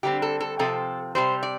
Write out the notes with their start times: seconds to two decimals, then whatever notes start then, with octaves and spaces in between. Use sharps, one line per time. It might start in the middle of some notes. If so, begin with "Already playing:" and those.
0.03 D3 G3 C4 G4
0.22 A4
0.40 A4
0.59 C3 F3 C4 A4
1.15 C3 G3 C4 C5
1.43 D5